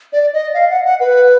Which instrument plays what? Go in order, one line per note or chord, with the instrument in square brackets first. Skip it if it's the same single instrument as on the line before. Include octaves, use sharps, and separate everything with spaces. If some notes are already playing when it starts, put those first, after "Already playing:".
[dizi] D5
D#5
F5
F#5
F#5
B4